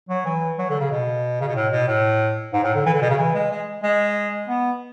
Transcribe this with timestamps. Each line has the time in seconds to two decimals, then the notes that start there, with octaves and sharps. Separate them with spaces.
0.09 F#3
0.25 E3
0.58 F#3
0.69 D3
0.80 C#3
0.91 B2
1.41 C#3
1.48 B2
1.56 A2
1.72 B2
1.88 A2
2.53 G#2
2.64 A2
2.75 D3
2.86 E3
2.94 D3
3.02 B2
3.10 C#3
3.18 E3
3.35 G#3
3.51 G#3
3.83 G#3
4.48 B3